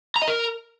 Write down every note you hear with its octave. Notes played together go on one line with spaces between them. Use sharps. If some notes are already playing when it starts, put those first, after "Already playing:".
A#5
D#5
A#4